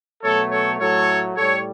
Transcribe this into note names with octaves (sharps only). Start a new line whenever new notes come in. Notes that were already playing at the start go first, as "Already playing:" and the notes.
B2 F#3 A3 A4 C#5
A4 C#5
A2 F#3 A3 A4 C#5
A2 G3 A4 C#5